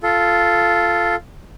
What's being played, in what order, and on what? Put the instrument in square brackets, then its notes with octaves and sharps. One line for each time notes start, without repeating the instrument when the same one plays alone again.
[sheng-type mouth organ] F4 A4